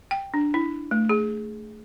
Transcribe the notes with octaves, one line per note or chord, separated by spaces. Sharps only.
G5
D4
E4
A3
G#4